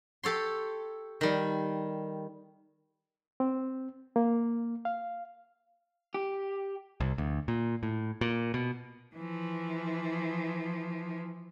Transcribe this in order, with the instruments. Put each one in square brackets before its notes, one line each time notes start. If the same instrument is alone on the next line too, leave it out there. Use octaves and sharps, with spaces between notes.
[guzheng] G4 A4 C#5 C6
D#3 G3
[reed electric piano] C4
A#3
F5
[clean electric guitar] G4
[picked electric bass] C2
D2
A#2
A2
A#2
B2
[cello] E3 F3